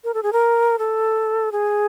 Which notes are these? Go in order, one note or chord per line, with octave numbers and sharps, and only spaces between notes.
A#4
A4
G#4
A#4
A4
G#4